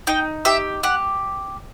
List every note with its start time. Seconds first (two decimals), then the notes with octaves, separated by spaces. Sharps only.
0.07 D#4 G5
0.45 G4 E5
0.83 G4 F#5